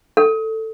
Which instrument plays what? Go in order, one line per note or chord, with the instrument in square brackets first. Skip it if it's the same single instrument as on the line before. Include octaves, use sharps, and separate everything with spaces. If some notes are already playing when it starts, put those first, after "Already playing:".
[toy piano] A4